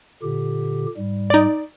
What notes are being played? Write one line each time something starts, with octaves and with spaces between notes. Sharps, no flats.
A#2 D3 G4
G#2 G3
D#4 D5